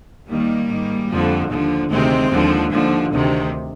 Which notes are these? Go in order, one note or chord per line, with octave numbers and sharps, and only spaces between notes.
D#2 D#3 G3 A#3
G#2 D#3
F2 D3 F3
D#2 D3 F3
D2 C3 D#3 G#3 C4
D#2 D3 F3
D#2 D3 F3
D2 C3 D#3